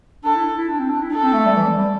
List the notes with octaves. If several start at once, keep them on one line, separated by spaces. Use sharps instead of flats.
D4 A4
E4
E4
D4
C4
D4
E4
D4 A4
C4
A3
G3
E3
G3
G3